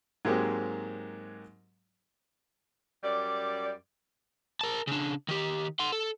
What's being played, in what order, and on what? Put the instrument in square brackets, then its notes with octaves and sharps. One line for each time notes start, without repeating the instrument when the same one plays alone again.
[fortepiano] G#2 F#3 G#3 A#3 C4 G4
[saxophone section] F#2 G3 D5
[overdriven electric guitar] A#4 A5
C#3 D4
D#3 G4
F#5 C6
A4